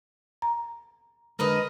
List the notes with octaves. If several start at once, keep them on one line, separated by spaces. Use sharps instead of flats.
A#5
D3 G#3 A#4 B4 D#5